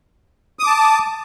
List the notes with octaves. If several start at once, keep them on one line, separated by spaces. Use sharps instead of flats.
A5 D6 D#6